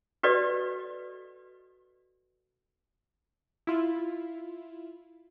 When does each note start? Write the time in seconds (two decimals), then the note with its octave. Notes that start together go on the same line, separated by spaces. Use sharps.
0.23 F#4 G4 A4 B4 D5 D#5
3.67 E4 F4